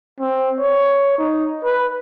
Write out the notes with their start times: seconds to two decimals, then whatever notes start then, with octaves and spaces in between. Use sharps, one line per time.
0.20 C4
0.59 C#5
1.18 D#4
1.64 B4